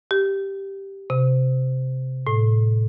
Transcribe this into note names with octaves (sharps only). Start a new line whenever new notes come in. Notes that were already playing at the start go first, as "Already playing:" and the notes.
G4
C3
A2